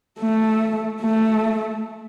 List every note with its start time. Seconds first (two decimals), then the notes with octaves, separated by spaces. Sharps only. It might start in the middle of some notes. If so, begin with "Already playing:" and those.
0.20 A3
1.02 A3